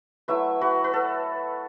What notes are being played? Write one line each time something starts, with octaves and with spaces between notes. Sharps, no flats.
F#3 A3 E4 B4 E5
F#4 B4
B4
A4